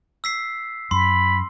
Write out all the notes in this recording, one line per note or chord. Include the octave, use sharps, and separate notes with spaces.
E6 B6 C7
F#2 B5 C6